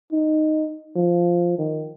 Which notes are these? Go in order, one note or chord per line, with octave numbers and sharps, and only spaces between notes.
D#4
F3
D#3